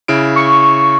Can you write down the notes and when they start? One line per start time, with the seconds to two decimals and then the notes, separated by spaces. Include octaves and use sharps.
0.08 C#3 E4 D7
0.36 C#6